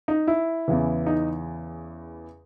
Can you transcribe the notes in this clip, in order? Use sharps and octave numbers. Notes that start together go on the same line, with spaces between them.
D#4
E4
E2 C#3 E3
D#4